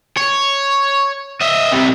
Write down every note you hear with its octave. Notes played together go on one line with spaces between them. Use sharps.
C#5
D#5 E5
C3 G3